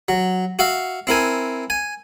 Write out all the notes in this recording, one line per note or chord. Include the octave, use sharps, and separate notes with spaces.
F#3
F#4 E5 F5
C4 E4 A#4 G#5
G#5